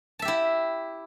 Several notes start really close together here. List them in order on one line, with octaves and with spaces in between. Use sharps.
A5 E5 G4 E4